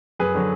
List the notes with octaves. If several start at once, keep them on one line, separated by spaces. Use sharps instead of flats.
F#2 G#4 B4
D3 F#3